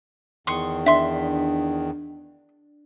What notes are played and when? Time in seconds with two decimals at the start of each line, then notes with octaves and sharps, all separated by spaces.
0.47 E2 D#3 C6 C#6 D#6
0.86 D4 E5 C6